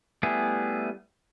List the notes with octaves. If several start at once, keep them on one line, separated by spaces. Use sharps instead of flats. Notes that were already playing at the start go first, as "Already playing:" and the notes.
G3 A3 B3 E4 G#4